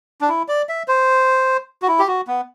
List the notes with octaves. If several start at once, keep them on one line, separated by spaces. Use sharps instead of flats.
D4
E4
D5
E5
C5
F#4
E4
G4
F#4
B3